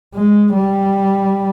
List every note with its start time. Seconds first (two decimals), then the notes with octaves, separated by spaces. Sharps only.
0.15 G#3
0.54 G3